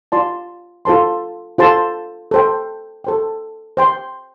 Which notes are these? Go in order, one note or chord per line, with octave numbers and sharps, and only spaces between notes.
F4 D5 A5 C6
F4 A4 C5 A5 C6
F4 A4 C5 A5 C6
A4 C5 G5
A4 C5 G5
C5 G5 C6